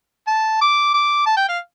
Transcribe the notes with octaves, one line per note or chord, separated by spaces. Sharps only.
A5
D6
D6
A5
G5
F5